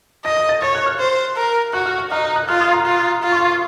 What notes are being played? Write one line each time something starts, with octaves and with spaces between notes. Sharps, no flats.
D#5 A#6
A#6
A6
C#5 A6
F#6
F6
C5
A#4
F#4 F#6
F6
F#6
D#4 F6
D#6
F#6
F4 F6
D#6
A#5
F4
F4
C#6
C6
C#6